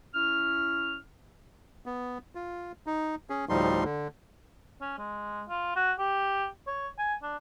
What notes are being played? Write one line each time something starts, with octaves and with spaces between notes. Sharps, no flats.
C#4 E4 F6
B3
F4
D#4
C#4 G#4
D2 A2 F3 G3 D#4 C6
D3
C#4
G#3
F4
F#4
G4
C#5
G#5
D4